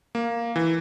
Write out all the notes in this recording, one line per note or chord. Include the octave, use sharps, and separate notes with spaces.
A#3
E3